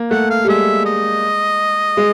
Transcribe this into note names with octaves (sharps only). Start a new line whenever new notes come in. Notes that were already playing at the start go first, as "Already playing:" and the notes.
Already playing: A#3
A3 F#5
F5
G3
G#3 E5
D#5
G#3